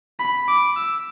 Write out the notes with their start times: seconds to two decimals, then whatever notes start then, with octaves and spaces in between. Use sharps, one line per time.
0.19 B5
0.48 D6
0.76 E6